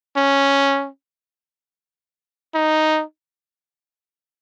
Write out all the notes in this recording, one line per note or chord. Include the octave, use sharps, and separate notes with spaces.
C#4
D#4